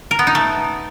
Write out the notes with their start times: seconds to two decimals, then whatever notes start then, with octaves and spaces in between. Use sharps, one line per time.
0.11 A#4
0.19 B3
0.27 D#4
0.35 A3